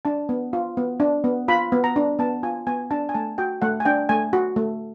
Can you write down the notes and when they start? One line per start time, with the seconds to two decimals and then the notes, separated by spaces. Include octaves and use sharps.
0.05 D4 A5
0.29 B3
0.53 F4
0.77 B3
1.00 D4
1.24 B3
1.48 F4 B5
1.72 B3
1.84 A#5
1.96 D4
2.19 B3 A5
2.43 F4 G#5
2.67 B3 G#5
2.91 D4 A5
3.09 G#5
3.14 A3 A5
3.38 F#4 G5
3.62 A3 F#5
3.80 G#5
3.85 D4 G5
4.09 A3 G#5
4.33 F#4
4.56 A3